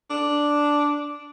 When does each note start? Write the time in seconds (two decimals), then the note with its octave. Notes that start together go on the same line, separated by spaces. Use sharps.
0.10 D4